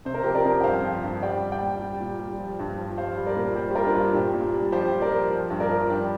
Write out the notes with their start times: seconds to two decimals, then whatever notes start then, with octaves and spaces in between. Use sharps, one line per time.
0.05 C3 C5
0.14 A#4
0.23 F3 G4 C5
0.35 A#4 D5
0.45 F2
0.61 G5
0.64 G2 C5 F5
0.84 F3
1.03 G2
1.22 G3 D5 G5
1.42 G3
1.52 D5 G5
1.61 A#2
1.81 G3
2.00 A#2
2.19 G3
2.39 F3
2.59 G2
2.78 F3
2.98 G3 C5 F5
3.17 G3
3.26 A#4 D5
3.36 A#2
3.56 G3 G4 C5
3.71 G4
3.75 G3 F4 A#4
3.85 D4
3.94 G2 F4
4.14 A#2 D4 G4
4.34 A#2
4.53 G3
4.72 F3 G4 C5
4.92 F3
5.01 A#4 D5
5.11 F3
5.31 F3
5.50 G2
5.60 A#4 D5
5.69 F3
5.89 G3 D4 G4